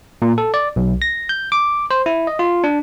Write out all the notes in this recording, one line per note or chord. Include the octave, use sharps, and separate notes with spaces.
A#2
A4
D5
B1
A#6
G6
D6
C5
E4
D#5
F4
D4